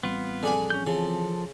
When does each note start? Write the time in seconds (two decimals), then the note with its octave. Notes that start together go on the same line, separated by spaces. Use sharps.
0.03 A1 G3 B3 C4 F4
0.43 F2 D3 D4 G#4 G#5
0.70 C#4 G6
0.87 C#3 E3 F3 A4